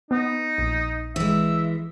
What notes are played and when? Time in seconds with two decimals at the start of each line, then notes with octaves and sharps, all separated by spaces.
0.11 B3 D#4
0.58 A#1
1.16 E3 G#3 E5